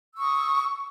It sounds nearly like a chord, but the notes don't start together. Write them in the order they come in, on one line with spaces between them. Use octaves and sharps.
E6 C#6 D#6